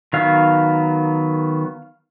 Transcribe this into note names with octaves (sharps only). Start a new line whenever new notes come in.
D#3 F#3 B3 F5